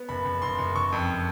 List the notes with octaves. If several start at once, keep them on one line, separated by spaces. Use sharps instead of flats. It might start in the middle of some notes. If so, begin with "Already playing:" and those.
Already playing: B3
F#1 B5
F#1
F#1 C6
F#1
F#1 C#6
F2